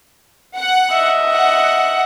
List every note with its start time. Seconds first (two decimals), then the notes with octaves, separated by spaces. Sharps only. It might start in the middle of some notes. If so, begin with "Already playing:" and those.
0.57 F#5
0.91 D#5 E5
1.30 F#5